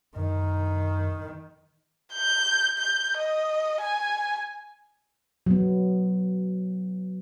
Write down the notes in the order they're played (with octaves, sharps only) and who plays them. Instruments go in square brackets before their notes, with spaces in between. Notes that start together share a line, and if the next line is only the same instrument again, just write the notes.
[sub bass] F#2 [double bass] D#3
[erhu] G6
G6
D#5
G#5
[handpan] F#3 B3